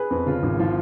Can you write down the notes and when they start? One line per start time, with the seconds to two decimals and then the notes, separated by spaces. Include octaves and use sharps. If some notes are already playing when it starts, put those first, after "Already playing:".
Already playing: G#4 B4
0.11 F2
0.26 C#3 F4
0.43 G#1
0.59 F3 F4